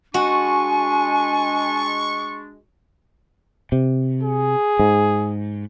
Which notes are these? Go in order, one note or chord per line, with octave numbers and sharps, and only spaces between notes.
G#3 D4 F#4 G#5 C#6
C3
G#4
G#2